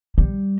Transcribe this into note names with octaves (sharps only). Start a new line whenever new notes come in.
G3